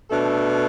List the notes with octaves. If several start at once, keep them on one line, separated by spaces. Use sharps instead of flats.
B2 A3 D4 A4